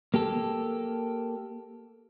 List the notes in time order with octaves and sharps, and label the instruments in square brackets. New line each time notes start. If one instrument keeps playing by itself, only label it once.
[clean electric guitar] A#3 G4 A4